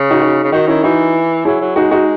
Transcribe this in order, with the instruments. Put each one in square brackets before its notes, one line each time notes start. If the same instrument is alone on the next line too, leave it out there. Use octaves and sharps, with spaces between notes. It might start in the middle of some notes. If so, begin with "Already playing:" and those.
Already playing: [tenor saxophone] C#3
[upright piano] D#4 F#4
D#4 F#4
[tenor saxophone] C#3
[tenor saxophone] D#3 [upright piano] D#4 F#4
[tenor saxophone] D#3 [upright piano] C#4 E4
[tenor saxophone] E3 [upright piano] D#4 F#4
[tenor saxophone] F#3 [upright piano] E4 G#4
[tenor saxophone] F#3
[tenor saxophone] G#3 [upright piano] D#4 F#4
[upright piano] D#4 F#4